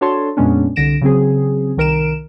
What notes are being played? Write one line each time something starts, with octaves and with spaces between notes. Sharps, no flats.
D4 F#4 A4 C#5 A5 C6
F2 A#2 G#3 B3 C#4 D4
C2 D3 A#6 D7 E7
C#3 F#3 C4 G#4
C2 D#3 A#4 D7 E7